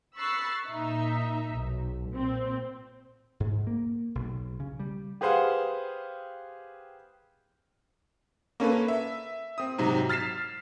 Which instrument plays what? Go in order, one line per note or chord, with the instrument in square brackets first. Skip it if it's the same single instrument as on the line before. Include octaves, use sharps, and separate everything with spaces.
[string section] B5 C#6 E6 F#6 A6 C7
A#2 D#4 E5
B1
A#2 C4
[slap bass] G#2
A#3
B1
C#3
G3
[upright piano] G4 G#4 B4 C5 F5 F#5
[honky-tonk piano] A#3 C#4 A4 B4
E5
C4 D#6
G#2 C3 F#3
F6 A6 B6 C7 E7